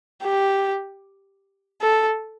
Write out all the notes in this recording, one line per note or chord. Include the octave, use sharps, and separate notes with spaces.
G4
A4